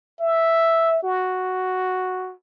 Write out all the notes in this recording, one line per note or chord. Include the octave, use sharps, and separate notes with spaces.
E5
F#4